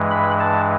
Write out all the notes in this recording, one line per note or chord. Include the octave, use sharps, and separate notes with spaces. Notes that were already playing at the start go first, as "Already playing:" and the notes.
Already playing: G2 E3 G#3
B5
A5